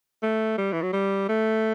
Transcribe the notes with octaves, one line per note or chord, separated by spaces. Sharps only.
A3
G3
E3
F#3
G3
A3